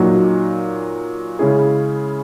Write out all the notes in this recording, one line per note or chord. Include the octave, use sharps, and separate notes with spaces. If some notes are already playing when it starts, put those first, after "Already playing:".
Already playing: A#2 F#3 A#3 D#4 F#4
C#3 G#3 C#4 E4 G#4